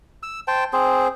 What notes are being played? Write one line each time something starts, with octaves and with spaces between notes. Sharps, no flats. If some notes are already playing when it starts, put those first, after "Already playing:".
E6
C5 G5 A5
C4 G#4 C5